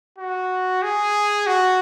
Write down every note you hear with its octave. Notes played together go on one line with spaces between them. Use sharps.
F#4
G#4
F#4